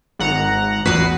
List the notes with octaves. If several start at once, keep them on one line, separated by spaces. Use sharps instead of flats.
G#1 F#5 A#5
A1 E2 F#4 B4 C7